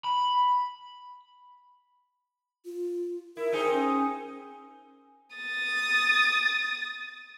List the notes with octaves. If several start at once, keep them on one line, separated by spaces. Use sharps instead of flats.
B5
F4
E4 A#4
C4 D#4 G#4
C#4
D#6 A6